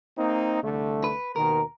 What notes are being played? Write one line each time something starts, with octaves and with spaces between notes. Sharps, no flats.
A#3 C4 D#4
C2 D3 A3
B4
D#2 B2 D#3 A#4